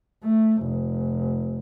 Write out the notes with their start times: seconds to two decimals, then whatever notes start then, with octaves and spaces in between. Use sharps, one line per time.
0.24 A3
0.64 F1